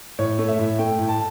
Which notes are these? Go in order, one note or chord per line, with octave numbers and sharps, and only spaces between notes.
A2 C#5
A3
E5
A2
A3 G5
A2
A5